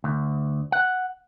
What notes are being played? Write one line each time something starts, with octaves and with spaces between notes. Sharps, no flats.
D2
F#5